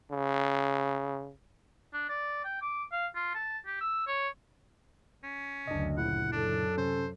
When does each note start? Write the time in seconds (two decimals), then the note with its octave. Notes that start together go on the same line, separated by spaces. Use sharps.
0.12 C#3
1.93 D4
2.09 D5
2.45 G5
2.62 D6
2.92 F5
3.15 F4
3.35 A5
3.66 G4
3.81 E6
4.07 C#5
5.23 C#4
5.67 F#1 D2 D4 D#5
5.98 A#2 C#3 E4 F#5
6.32 F#2 D4 A4
6.77 C3 C#4 C5